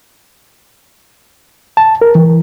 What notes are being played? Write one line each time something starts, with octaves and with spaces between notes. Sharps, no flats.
A5
A#4
E3